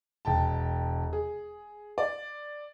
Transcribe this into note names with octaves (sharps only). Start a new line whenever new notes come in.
E1 G5 A5
G#4
D5